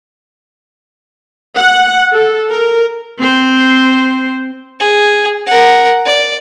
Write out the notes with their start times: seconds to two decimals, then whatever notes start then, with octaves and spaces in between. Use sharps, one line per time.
1.56 F#5
2.11 A4
2.51 A#4
3.18 C4 C5
4.80 G#4
5.46 A#4 F#5
6.05 D5